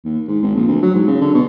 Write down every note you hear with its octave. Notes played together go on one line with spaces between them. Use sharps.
D#2
G#2
G#1
A#1
D2
F#3
G#2
C#3
D3
B2